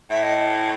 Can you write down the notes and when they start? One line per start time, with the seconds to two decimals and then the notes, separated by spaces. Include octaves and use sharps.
0.10 A2 E5
0.23 D#5